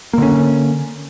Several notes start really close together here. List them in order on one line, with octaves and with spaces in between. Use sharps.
A#3 D3 C#4